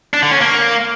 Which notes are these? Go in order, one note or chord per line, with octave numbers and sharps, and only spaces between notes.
D4
D3
C#4
A#3